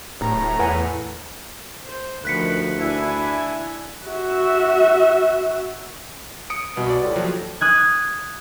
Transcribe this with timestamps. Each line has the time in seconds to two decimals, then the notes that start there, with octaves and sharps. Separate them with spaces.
0.21 D1 A2 A#5
0.59 E2 B4 F#5 G#5
1.86 C5
2.25 D2 D#3 F3 B4 F#6 B6 C#7
2.79 D4 E4 G#5
4.06 F#4 E5
6.50 D#6 C#7 D7
6.77 C2 B2
6.90 D5
7.04 A2 G3 F4
7.16 D#2 F3 F#3
7.61 D#6 F#6 G#6